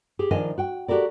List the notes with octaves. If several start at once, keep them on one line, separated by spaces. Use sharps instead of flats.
G4 G#4
D#3 F3 D4 A#4 D#5 G#5
F#4 G5
F#4 G4 A4 A#4 D5